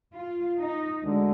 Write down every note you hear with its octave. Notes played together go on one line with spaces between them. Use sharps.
F4
D#4
D2 D3 G#3